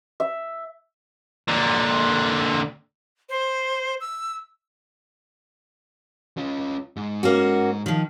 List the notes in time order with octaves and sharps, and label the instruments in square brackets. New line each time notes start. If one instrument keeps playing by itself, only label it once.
[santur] E5
[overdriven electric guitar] A#2 D3
[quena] C5
E6
[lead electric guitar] C#4 F4
G#2 G#3
[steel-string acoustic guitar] A#3 C#4 F#4
D#3 F3